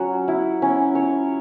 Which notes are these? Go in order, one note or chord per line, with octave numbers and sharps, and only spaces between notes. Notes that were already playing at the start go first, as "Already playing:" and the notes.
Already playing: F#3 C#4
E4
C#4
C#5